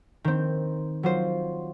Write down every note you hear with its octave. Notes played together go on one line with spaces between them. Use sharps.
D#3 C4
F#3 F4 C5